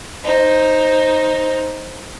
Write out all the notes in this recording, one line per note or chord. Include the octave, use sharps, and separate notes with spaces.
D#4 C5